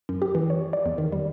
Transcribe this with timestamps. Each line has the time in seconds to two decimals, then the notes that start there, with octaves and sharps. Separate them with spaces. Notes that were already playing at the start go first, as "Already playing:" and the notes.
0.09 F#2
0.22 G4
0.35 E3
0.50 C#5
0.73 D5
0.86 E2
0.98 D#3
1.12 G3